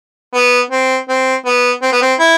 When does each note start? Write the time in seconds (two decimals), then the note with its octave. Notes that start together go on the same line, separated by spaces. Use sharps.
0.34 B3
0.71 C4
1.09 C4
1.46 B3
1.82 C4
1.93 B3
2.02 C4
2.20 E4